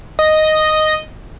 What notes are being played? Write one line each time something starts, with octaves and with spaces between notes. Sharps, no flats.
D#5